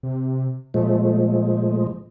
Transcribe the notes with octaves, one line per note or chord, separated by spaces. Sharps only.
C3
A#2 F3 G#3 A3